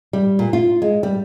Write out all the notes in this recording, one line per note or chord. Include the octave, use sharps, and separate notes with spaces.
G3
A#2
F4
G#3
G3